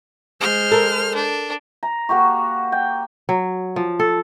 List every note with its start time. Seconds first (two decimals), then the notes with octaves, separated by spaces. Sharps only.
0.41 G#3 C5 F6
0.72 A4 A#4
1.15 D4
1.83 A#5
2.09 A#3 F#4 G4 C#6
2.72 G5
3.29 F#3
3.76 F3
4.00 A4